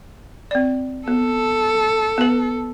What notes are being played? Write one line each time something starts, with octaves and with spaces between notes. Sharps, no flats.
C4 D5
B3 A4
B3 B4